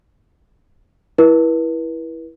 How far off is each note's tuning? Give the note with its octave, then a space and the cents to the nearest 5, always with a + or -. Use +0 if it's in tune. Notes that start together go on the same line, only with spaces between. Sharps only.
E4 +0 B4 -40